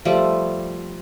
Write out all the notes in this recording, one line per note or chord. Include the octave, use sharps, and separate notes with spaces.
F3 G3 A3